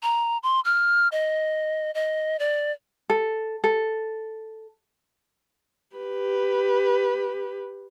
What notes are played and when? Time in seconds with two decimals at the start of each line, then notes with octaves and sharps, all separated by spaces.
0.03 A#5
0.43 C6
0.65 F6
1.12 D#5
1.95 D#5
2.39 D5
3.10 A4
3.64 A4
5.96 G4 B4